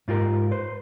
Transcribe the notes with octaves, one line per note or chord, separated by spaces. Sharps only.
G#2 F4 G4 A#4
B4 C5